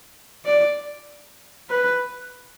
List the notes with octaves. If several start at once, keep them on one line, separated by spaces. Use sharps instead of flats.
D5
B4